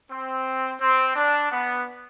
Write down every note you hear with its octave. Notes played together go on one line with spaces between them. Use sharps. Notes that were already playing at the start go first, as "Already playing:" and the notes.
C4
C4
D4
B3